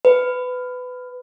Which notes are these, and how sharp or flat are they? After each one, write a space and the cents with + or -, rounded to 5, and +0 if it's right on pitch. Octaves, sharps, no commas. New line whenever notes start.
B4 +20